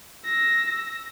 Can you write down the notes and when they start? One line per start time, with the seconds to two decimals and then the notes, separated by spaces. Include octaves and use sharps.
0.25 E6 A#6